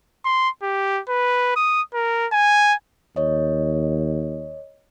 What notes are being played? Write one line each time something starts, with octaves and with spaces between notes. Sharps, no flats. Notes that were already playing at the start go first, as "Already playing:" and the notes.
C6
G4
B4
D#6
A#4
G#5
D#2 C#5 D#5